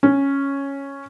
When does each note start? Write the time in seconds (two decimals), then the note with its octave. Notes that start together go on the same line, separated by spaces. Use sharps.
0.03 C#4